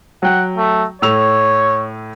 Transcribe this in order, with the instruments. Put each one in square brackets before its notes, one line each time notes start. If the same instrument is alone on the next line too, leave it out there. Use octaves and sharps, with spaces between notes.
[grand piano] F#3 G5 [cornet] F#5
[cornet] A3
[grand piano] A2 E6 F7 [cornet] C#5